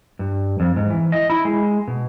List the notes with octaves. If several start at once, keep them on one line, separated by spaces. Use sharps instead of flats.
G2
F2
G#2
E3
D#5
E4
G#3
B2